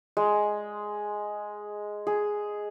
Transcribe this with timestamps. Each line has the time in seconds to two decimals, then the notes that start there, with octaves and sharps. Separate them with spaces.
0.17 G#3
2.07 G#4